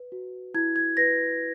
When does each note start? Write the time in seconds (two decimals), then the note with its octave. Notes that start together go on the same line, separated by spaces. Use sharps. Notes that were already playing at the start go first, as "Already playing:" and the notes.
Already playing: B4
0.12 F#4
0.54 E4 G#6
0.76 G#6
0.97 B4 A#6